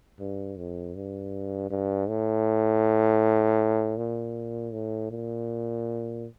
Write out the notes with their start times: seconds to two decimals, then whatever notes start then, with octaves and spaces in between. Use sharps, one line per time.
0.19 G2
0.57 F2
0.95 G2
1.70 G2
2.09 A2
3.97 A#2
4.73 A2
5.11 A#2